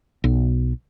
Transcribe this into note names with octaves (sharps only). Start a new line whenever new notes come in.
B1